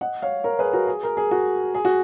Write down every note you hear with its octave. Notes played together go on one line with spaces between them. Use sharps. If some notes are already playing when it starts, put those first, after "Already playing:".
D#5 F#5
C#5 F5
A#4 C#5
G#4 B4
F#4 A#4
G#4
A#4
G#4
F#4
G#4
F#4